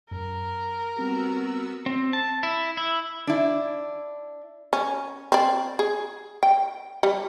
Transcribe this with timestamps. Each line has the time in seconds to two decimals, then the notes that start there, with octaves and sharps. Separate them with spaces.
0.11 F#2 A#4
0.97 G3 B3 C4 F#4 G4 E6
1.86 C4
2.13 A5
2.43 E4
2.77 E4
3.27 D4 E4
4.73 C#4
5.32 C4 D5
5.79 G#4
6.43 G5
7.03 G3